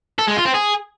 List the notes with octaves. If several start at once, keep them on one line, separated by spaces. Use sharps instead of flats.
A4
G#3
F4
C4
G#4